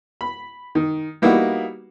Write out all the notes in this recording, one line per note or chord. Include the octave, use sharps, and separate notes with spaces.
B5
D#3
G3 A#3 B3 D#4 E4 F#4